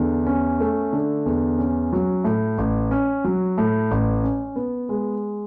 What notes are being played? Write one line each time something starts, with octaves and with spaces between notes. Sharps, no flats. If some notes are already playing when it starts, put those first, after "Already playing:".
Already playing: E2 D3
C#4
A3
D3
E2
C#4
F#3
A2
A1
C#4
F#3
A2
A1
C#4
B3
G#3